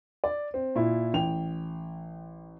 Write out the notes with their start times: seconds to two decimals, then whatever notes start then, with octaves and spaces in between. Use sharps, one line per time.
0.24 D5
0.54 C4
0.76 A#2 E4
1.14 A1 G5 F7